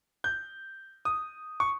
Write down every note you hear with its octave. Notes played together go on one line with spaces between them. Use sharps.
G6
D#6
C#6